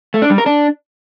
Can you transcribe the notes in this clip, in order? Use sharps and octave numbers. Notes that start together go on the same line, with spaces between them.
A3
D4
G3
A#4
D4